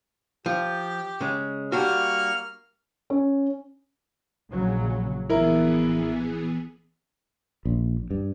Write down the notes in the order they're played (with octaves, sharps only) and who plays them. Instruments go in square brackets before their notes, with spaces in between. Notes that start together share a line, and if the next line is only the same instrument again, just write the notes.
[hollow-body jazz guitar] F3 [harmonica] G4
[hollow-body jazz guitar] C#3 G#3
[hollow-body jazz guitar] G3 D4 F#4 [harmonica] A#3 C#6 F6
[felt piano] C#4
[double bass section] A#1 C#3 F#3
[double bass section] A#1 [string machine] E3 B3 G#4 [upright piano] E4 A#4
[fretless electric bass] A#1
G2